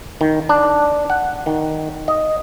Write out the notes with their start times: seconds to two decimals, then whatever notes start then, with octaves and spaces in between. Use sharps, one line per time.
0.21 D#3
0.49 D4
1.10 F#5
1.46 D#3
2.08 D#5